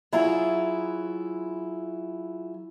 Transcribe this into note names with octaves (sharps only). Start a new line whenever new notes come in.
F#3 E4 F4 G#4